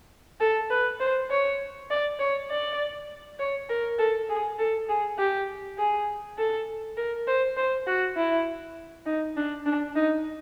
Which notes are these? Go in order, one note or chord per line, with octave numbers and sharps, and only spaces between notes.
A4
B4
C5
C#5
D5
C#5
D5
C#5
A#4
A4
G#4
A4
G#4
G4
G#4
A4
A#4
C5
C5
F#4
E4
D#4
D4
D4
D#4